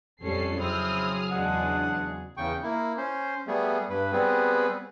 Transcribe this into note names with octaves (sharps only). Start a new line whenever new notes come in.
F2 G3 C#4 A4 C7
C#3 F#3 C4 E4 G#4 D#6 F6
E2 G#3 D4 F#5
E2 C#3 G5 C#6
A#3 E4
C#4 C5
G3 A3 B3 G#4
G2 B4
G3 B3 C4 G#4 B4